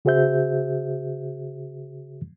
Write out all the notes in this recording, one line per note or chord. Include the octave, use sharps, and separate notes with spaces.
C#3 F#4 G#4 C5 E5 G6